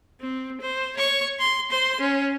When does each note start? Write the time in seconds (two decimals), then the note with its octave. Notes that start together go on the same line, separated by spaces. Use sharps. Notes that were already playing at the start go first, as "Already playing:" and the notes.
0.21 C4
0.61 C5
0.97 C#5 C#6
1.39 C6
1.71 C5 C6
2.00 C#4